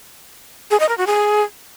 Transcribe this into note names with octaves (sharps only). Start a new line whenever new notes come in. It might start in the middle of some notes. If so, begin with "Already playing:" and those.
G#4
D#5
A#4
F#4
G#4